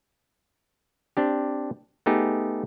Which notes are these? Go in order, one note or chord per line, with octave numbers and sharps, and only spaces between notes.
C4 D4 G4
A3 B3 D#4 G4 G#4